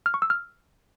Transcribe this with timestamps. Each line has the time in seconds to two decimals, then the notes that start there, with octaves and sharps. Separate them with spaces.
0.06 F6
0.14 C#6
0.22 E6
0.30 F6